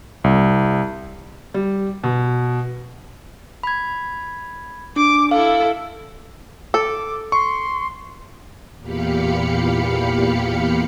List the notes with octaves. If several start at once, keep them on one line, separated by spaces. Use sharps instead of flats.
C2
G3
B2
B5 G#6
D4 D6
E4 A4 F5
A4 D6
C6 C#6
E2 A#2 G4 F5 B5 C#7